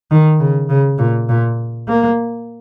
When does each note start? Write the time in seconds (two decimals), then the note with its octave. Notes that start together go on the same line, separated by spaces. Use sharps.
0.11 D#3
0.40 C#3
0.69 C#3
0.99 A#2
1.29 A#2
1.88 A#3